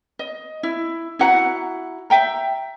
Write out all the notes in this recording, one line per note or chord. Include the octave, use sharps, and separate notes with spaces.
D#5
E4
E4 F#4 F#5 A#5
E5 G5 A#5